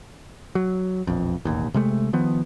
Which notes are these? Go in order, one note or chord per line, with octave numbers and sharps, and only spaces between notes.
F#3
E1 A#1 F2
E1 A1 D#2
C3 G#3 A3
D#3 F3 B3